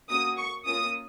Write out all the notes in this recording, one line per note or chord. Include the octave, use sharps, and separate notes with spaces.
A#3 C#4 F#4 D#6
C#6
A#3 C#4 F4 D#6